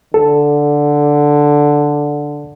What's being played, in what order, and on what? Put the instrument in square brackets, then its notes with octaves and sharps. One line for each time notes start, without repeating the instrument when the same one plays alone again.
[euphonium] D3 [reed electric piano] A4